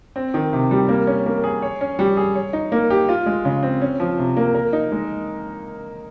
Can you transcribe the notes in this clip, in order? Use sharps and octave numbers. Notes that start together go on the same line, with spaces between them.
C4
D#3
C3
G3
A#3
C#4
A#3
G#4
C#5
C#4
G3
G#4
C#5
D#4
A#3
G4
F4
G#3
C#3
C4
C#4
F3
C3
A#3
A#4
D#4
G#3